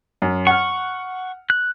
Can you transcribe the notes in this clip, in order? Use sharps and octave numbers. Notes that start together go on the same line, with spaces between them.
F#2
F#5 C#6 F6
F#6